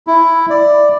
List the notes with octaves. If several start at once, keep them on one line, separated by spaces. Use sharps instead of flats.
E4
D5